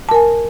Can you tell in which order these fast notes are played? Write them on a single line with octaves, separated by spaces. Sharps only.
A5 A#4 G#5